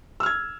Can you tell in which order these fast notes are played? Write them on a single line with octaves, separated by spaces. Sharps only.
E6 F6 G#6